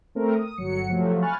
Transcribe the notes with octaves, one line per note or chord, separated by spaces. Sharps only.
A3 C4 A#4
D#6
G1 F#3 C#7
C3 F3 F#3 A3
G#5 B5 C#6 F6 F#6 A6